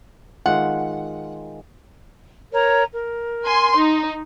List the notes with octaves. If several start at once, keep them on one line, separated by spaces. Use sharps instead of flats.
D#3 G#3 F4 F#5
A#4 C#5 A#5
A#4
G#5 C6
D#4